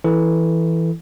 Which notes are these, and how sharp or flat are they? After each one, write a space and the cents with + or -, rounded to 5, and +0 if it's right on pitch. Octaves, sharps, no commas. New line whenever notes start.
E3 +0 E4 +0 A4 +0